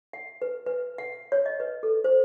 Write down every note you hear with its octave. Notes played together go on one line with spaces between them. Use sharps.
F#5
B4
B4
F#5
C#5
D#5
B4
A4
C5